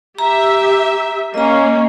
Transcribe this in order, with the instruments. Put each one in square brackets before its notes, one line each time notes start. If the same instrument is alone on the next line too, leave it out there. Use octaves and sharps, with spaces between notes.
[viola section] G4 E5 [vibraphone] A#5
[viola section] A#3 C#4 [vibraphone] D#5 A#5